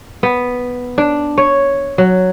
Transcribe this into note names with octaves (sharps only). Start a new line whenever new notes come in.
B3
D4
C#5
F#3